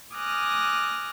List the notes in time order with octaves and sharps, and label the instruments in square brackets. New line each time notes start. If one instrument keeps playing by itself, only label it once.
[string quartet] G#5 D6 D#6 F6 F#6 A#6